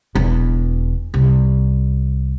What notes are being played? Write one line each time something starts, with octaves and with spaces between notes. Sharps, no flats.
E1 E2
C2